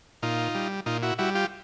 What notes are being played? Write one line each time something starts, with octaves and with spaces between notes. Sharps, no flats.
A#2 D#4 F4
G3
A#2 D#4 F4
E4 F#4
G3 E4 F#4
F4 G4